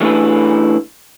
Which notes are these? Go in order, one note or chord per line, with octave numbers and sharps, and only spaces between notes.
E3 A3 D4 E4 G#4 B4